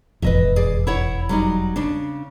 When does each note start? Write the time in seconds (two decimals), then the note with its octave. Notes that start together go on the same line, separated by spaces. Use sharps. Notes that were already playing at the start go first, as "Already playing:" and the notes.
0.22 E1 A1 F2 B4 D#5 E5
0.56 G#4 D5
0.87 E4 C#5 F#5
1.29 F#3 G3 D#4
1.76 C#3 D4